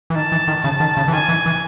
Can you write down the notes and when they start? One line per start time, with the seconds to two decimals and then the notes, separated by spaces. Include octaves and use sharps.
0.10 E3
0.15 D#3 A5
0.32 E3
0.48 D#3
0.64 C#3 A5
0.80 D#3
0.97 C#3
1.08 E3
1.13 D#3 G#5
1.29 E3
1.46 E3